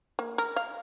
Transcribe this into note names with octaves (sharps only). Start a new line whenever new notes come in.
A#3
A#4
F5